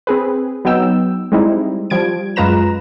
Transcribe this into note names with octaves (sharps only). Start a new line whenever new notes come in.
C4 G#4 B4
F#3 B3 D#4 G5 E6
G3 G#3 C4 D#4 E4
F3 G3 G#6 D7
F#2 G#3 F4 B4 A#5 E7